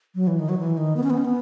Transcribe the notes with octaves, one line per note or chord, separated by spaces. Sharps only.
F#3
E3
D#3
F#3
E3
D#3
B3
C#4
B3
C#4
B3